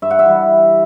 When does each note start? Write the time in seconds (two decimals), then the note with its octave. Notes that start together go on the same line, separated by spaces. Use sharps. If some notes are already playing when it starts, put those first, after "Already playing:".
0.02 G2 E5
0.11 F#5
0.19 E5
0.25 E3 G3